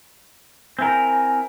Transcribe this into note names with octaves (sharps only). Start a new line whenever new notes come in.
C4 E4 A#4 G#5